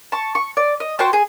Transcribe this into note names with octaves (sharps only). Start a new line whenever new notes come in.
A5 C#6
C#6
D5
D#5
F#4 C5 G5 A5
G#4